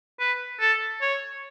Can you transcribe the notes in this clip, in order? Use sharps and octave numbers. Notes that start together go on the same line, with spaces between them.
B4
A4
C#5